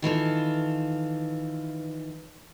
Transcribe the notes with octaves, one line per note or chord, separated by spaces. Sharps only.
D#3 E3 F4 A4